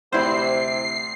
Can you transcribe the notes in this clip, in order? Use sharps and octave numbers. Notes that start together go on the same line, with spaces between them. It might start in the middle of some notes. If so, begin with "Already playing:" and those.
D2 C3 C4 E4 C5 C7